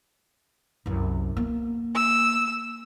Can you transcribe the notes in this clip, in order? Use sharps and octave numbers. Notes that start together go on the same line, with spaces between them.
C2 F#2
A#3 B3
E6